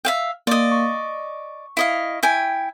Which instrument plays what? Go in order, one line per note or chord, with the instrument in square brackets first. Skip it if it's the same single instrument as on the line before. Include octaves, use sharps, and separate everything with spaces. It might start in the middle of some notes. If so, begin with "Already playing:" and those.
[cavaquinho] E5 F5 G5
[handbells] A#3 [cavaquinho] D5 D#5
[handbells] C#6
[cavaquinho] E4 D#5 F5
E4 G5 G#5